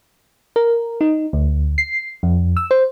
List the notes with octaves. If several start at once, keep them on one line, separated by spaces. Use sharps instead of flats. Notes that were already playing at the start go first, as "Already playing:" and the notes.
A#4
D#4
D2
C7
F2
E6
C5